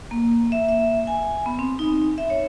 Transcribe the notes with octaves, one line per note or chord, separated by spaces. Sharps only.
A#3
E5
E5
G#5
B3
C4
D#4
E5
C#5